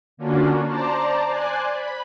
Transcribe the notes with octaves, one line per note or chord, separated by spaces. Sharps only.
D3 A#3 C#4 D4 F4 F#4
C5 D5 A5 A#5
C5 D5 G#5 F#6
B5